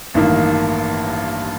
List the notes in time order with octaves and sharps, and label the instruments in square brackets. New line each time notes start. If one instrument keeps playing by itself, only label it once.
[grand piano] A1 G2 D#3 A#3